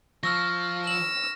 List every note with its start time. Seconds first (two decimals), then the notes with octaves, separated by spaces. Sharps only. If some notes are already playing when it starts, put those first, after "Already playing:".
0.23 F3 C#6 E6 F6 A#6
0.87 E6 F#7